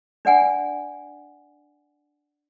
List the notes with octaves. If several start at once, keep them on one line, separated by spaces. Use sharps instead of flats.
D4 D5 F#5 G#5